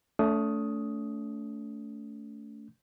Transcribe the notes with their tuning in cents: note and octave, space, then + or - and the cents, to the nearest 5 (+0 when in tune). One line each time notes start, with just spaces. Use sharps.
A3 +0 C#4 +45 D#6 +10